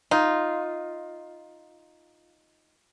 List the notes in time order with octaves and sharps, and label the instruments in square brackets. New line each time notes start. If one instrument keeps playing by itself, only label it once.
[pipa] D#4 [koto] F4